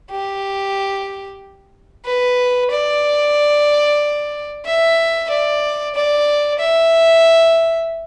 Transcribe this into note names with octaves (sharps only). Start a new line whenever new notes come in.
G4
B4
D5
E5
D5
D5
E5